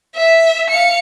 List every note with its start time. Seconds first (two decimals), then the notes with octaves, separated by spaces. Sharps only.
0.16 E5
0.69 F5 C#7